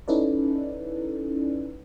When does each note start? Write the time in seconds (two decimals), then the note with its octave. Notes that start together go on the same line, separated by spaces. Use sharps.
0.08 C#4 D#4 E4 A4 B4 D5